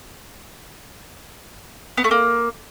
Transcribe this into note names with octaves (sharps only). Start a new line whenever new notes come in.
B3
A3
A#3